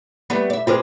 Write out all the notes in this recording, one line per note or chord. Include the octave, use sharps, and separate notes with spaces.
G3 A3 B3
D5 E5
C4 F4 G4 G#4 B4 C5